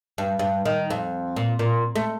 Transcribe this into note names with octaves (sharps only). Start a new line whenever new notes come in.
G2
G2
D#3
F2
A#2
A#2
A3